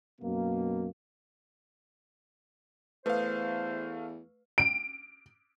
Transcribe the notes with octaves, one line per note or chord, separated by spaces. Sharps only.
F#2 B2 A#3
E2 A3 B4 C5 F5 D#6
D7